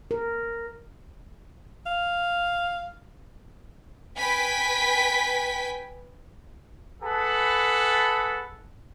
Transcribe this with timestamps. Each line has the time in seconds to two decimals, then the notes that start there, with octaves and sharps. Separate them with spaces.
0.11 A#4
1.86 F5
4.17 B4 G5 G#5 B6
7.02 G#4 A4 B4 F#5 A5 B5